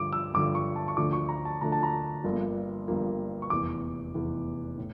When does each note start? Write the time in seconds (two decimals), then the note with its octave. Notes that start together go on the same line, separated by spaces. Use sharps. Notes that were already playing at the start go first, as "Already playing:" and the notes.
Already playing: G2 D3 F3 D6
0.13 E6
0.34 G2 D3 F3 D6
0.55 C#6
0.76 A5
0.88 C#6
0.97 D2 D3 F3 A3 D4 D6
1.13 C#6
1.29 A#5
1.45 A5
1.61 D2 D3 F3 A3 D4 A#5
1.72 A5
1.83 A#5
2.24 G1 G2 F3 A#3
2.88 G1 G2 F3 A#3
3.42 C#6
3.50 F1 E2 E3 D6
4.14 F1 E2 E3
4.78 A2